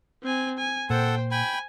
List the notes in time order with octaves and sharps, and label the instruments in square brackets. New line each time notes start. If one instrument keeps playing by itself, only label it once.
[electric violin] C4 G#5
G#5
[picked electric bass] A#2 [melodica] A4 F#5 A5 [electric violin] C5 G5
[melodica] G5 B5 [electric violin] G#5